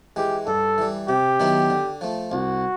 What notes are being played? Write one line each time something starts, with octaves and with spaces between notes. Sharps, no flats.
E3 G#3 G4
G2 A4
E3 G3
C3 G4
D#3 F#3 B3 E4
D3
F3 A3
C2 F#4